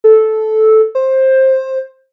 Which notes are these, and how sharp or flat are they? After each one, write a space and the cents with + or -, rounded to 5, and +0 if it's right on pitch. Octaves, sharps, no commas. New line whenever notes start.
A4 -10
C5 +15